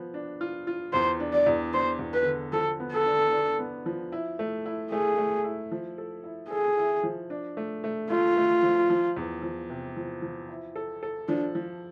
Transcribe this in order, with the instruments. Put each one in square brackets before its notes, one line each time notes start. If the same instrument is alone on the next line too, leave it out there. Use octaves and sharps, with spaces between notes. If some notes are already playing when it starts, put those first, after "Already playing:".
Already playing: [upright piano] F3 B3
D4
F4
F4
[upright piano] E2 [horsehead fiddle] C5
[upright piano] D4
[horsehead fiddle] D5
[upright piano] E2
[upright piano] D4 [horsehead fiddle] C5
[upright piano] E2
[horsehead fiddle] B4
[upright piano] D3
[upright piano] F3 [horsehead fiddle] A4
[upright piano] B3
[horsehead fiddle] A4
[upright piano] D4
D4
B3
F3
E4
A3
E4
[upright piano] A3 [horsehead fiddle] G#4
[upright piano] A3
E4
F3
A4
E4
[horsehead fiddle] G#4 [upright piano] A4
[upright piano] E4
F3
D4
A3
A3
[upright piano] A3 [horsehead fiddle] F4
[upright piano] A3
F3
F3
E2
F3
C3
F3
F3
E4
A4
A4
[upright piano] F3 [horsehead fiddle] D4
[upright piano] F3